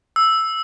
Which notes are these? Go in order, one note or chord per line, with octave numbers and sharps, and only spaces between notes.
E6